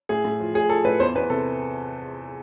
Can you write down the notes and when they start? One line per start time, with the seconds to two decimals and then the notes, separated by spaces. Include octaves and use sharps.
0.09 A2 G#4
0.25 A2
0.40 F3
0.54 A2 G#4
0.69 F3 A4
0.84 A2 B4
1.00 E2 C5
1.15 E2 B4
1.30 C3 A4